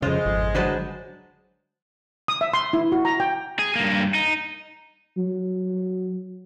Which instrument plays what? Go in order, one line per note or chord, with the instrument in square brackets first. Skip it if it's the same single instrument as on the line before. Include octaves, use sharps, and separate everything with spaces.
[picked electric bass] F2 C#3 [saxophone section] G#3 [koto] F4 C5
[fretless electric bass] G#1 [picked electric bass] F2
[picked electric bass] D3 E3 F#3 [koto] B4 C5 A5
[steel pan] D#6
E5
C6
E4
F#4
A#5
G5
[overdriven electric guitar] G#4
G2 A#3
D#4
[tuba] F#3